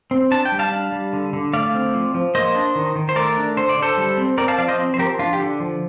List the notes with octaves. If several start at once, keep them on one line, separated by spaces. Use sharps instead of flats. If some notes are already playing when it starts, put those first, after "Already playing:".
C4
D4 A5
G5
G3
F5 A5
D4
G3
D3
D3
A3 D5 F5
C4
F3
F3
A#3 C5 D#5
D4
D#3
D#3
C5
A3 A#4 D5
D4
D3 C5
D5
D3
A4 C5
G3
C4
C4 A#4 D5
F5 A5
F3 D5 F5
C5 D#5
C4
C5
F3 G4 A#4
D4 F4
G4
D3
F3